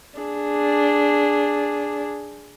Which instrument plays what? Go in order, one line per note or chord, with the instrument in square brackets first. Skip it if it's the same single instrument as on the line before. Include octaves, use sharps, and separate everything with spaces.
[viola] D4 G#4